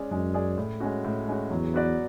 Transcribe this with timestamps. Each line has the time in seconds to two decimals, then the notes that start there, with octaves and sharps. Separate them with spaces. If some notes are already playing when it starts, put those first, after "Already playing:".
Already playing: G#3 C#4 G#4 D5
0.11 F#2 G#3
0.34 C#4 G#4 D5
0.58 A2
0.80 G#3 C#4 F#4
1.04 A2
1.28 G#3 C#4 F#4
1.51 E2 F#3
1.74 B3 F#4 B4 D5